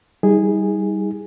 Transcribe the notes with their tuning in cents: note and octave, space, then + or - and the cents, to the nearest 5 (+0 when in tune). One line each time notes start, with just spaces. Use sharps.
G3 +0 D#4 +40 G#4 -10